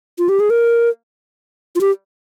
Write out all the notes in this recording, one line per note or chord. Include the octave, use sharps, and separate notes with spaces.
F4
G4
G#4
A#4
F4
G4